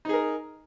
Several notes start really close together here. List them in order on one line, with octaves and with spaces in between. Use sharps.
D#4 G#4 A#4